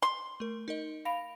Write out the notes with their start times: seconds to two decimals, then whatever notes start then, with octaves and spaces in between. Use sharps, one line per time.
0.02 C6
0.40 A3 A#4
0.68 D#4 A#4 D#5
1.05 F5 B5 A#6 D7 F7